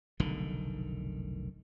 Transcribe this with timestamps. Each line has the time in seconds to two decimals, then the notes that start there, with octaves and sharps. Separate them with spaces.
0.20 F1 B1 D3 D#3